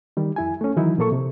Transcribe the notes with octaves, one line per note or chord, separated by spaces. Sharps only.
D#3 G3
F2 E4 G#5
A3 C#4
D#3 E3 F#3 D#4 E4
A#2 F3 A#3 A4 C#6
C3